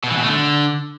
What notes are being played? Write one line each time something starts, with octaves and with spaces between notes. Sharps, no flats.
B2
E3
B2
A3
D3